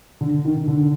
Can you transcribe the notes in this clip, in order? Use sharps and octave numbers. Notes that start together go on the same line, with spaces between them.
D3
D#3
D3
D3